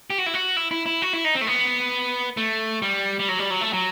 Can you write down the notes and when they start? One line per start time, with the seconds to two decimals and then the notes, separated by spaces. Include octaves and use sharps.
0.10 G4
0.18 F#4
0.26 E4
0.34 F#4
0.57 E4
0.71 E4
0.86 E4
1.02 F#4
1.13 E4
1.25 D#4
1.35 C4
1.41 A3
1.47 B3
2.37 A3
2.82 G3
3.19 G3
3.29 F#3
3.39 G3
3.50 F#3
3.61 A3
3.73 F#3